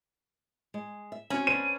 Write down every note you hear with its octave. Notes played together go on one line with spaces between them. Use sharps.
G#3
E5
C4 C#4 F#4
D4 B4 C5 D#7